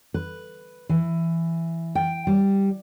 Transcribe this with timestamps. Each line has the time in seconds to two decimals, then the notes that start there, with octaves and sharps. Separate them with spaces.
0.14 B4
0.89 E3
1.95 G5
2.27 G3